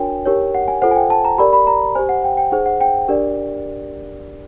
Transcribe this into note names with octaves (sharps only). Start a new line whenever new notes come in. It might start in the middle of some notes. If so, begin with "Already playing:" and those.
Already playing: D4 F#4 A#4 C#5 G5 G#5
D#4 G4 A#4 C#5
F#5
G#5
F4 A4 C5 F#5
G#5
G5
A5
A#5
G4 A#4 D5 B5
B5
A#5
G4 C5 G#5
F#5
G5
G5
D#4 G#4 C5 F#5
F#5
G5
D4 G4 A#4 D5